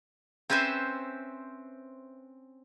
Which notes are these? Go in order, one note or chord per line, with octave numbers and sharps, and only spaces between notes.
C4 C#4 B4 C5 E5